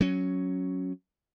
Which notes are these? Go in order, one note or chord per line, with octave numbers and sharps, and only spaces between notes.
F#3 C#4